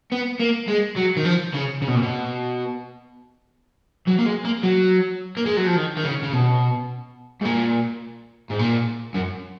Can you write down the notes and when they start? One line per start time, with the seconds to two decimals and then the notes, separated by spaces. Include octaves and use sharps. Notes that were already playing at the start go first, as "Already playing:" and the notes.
0.12 B3
0.40 A#3
0.68 G#3
0.97 F#3
1.17 D#3
1.25 F3
1.54 C#3
1.82 C#3
1.88 B2
1.95 A#2
2.02 B2
4.08 F#3
4.19 A#3
4.26 G#3
4.45 A#3
4.63 F#3
5.37 A#3
5.46 G#3
5.57 F#3
5.67 F3
5.76 D#3
5.97 D#3
6.05 C#3
6.23 C#3
6.33 B2
7.42 G#2
7.45 A#2
8.50 G#2
8.59 A#2
9.15 F#2